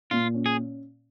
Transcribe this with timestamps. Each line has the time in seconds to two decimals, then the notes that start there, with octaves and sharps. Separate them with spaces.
0.11 A#2 F4
0.34 C#4
0.46 G#4